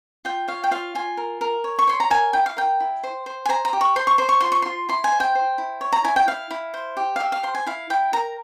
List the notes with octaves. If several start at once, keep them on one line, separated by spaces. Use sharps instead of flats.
F4 G5
C#5 F5
G5
F4 F5
F4 G#5
A#4
A#4
C#5
C#6
C#5 C6
A#5
A#4 G#5
E4 G5
F5
A#4 G5
E4
C5
C5
G#5
C5 A#5
A#5
G4
C#6
C5 C6
C#6
C5 C6
C#6
F4 C6
C#6
F4 C6
E4 C6
G#5
C5
G5
C5
E4
C#5
A#5
E4 G#5
G5
E4 F5
E4
C5
G4
F5
G4 E5
F5
C5 C6
G#5
E4 F5
E4 G5
A#4 A#5